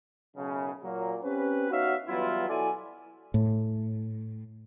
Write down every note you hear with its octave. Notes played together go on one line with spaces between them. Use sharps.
B1 F#2 C#3
A#2 F#3 A#3
C4 C#4 G4 B4
B3 D#4 F#4 C#5 E5 F5
E3 F#3 G3 B3 E4 F4
B2 F#3 E4 A4 D5 G#5
A2